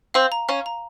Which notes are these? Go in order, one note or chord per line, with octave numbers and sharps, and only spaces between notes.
C4 F5
A#5
C#4 F5
A#5